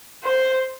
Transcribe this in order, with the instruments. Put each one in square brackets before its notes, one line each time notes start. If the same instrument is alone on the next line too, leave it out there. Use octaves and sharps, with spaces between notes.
[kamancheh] C5